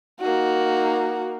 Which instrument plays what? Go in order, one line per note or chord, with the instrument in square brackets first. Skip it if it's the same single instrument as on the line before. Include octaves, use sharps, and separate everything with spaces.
[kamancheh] A#3 D#4 [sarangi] F#4